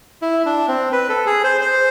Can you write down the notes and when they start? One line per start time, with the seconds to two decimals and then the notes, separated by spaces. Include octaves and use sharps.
0.22 E4
0.45 D4
0.68 C4
0.92 B4
1.09 A4
1.26 G#4
1.44 C5
1.61 C5